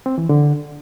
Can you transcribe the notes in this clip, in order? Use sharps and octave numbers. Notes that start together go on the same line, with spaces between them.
C4
E3
D3